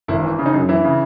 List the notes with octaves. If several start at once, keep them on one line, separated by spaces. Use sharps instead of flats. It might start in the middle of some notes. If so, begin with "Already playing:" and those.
G#1 E4
E3
C#3
D#4
F#2
E3 E4
C#3